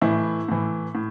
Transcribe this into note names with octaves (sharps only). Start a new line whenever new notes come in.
A2 E3 E4
A2 E3
A2